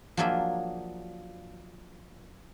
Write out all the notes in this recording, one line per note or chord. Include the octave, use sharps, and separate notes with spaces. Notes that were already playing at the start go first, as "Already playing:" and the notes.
F3 F#3 A#3 D4 G#4 E5